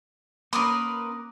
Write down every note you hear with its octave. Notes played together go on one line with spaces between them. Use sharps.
A#3 C#4 A#4 B4 C6 D6 D#6